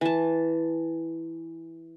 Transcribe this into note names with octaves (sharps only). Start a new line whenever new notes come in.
E3 A5